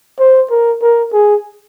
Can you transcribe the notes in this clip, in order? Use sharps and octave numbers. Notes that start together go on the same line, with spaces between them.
C5
A#4
A#4
G#4